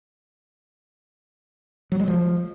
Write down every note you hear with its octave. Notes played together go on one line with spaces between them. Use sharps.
F#3
G#3
F3